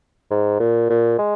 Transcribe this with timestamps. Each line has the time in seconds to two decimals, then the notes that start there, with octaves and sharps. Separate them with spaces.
0.31 G#2
0.60 A#2
0.90 A#2
1.19 G#3